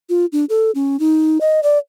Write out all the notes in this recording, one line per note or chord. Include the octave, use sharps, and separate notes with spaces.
F4
D4
A4
C#4
D#4
D#5
D5